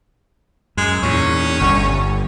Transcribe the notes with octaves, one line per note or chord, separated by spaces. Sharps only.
F#2 G#3
E2 A#2 C#4
G1 D3